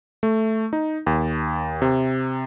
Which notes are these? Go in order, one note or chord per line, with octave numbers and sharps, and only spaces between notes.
A3
D#4
D#2
C3